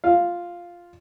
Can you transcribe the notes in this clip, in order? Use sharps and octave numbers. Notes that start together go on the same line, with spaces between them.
F4 F5